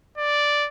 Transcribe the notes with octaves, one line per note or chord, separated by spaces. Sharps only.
D5